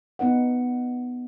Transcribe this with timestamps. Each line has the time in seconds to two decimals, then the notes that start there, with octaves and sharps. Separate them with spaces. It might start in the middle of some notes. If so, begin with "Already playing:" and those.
0.19 B3 D#4 B4 F#5